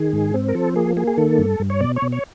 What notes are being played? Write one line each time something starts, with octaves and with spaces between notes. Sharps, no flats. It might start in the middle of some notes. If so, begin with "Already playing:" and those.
Already playing: D#3 G#4
G#2
C4
A#4
F3 A4
A#3 G#4
A#3 G#4
G#4
D#3 A4
G2
G2
C#5
B2 D5
C#5
B2
C#5